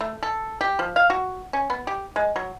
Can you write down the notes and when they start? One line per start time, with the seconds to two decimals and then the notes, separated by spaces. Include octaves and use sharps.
0.01 A3
0.23 A4
0.61 G4
0.79 F3
0.96 F5
1.10 F#4
1.53 C#4
1.70 B3
1.87 G4
2.16 G#3
2.36 F#3